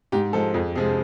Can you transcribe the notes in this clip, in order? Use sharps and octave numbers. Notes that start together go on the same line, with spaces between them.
G#2 G4
F3 G#3 A4
F2 G#4
C3 F3 G#3 G#4